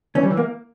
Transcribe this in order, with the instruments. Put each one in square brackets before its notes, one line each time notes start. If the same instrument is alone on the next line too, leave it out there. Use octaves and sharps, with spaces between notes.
[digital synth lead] E3 [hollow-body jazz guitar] C#4
[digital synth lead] G3
E3
[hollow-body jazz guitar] A#3